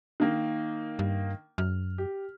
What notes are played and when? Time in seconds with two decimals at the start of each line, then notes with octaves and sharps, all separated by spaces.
0.20 D#3 A#3
0.99 G2
1.58 F#2 F6
1.98 G4